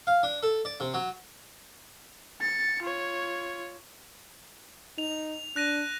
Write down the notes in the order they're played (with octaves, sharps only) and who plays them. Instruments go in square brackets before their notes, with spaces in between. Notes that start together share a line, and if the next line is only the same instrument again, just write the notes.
[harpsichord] F5
D4
A4
D5
C3
F#3
[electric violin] A6 C#7
F4 C#5
[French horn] D#4 [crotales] F7
[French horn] D4 [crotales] F#6 A#6 D#7